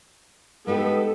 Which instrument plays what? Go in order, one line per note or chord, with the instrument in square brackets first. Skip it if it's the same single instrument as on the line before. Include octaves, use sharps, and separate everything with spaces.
[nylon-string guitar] G#3 D#4 G4 [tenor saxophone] B3 [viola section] A4